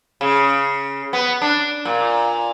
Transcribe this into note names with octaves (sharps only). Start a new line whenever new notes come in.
C#3
B3
D4
A#2